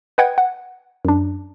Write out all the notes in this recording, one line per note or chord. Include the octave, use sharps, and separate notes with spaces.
B4 D#5 F#5 G5 G#6
F#5
F#2 D4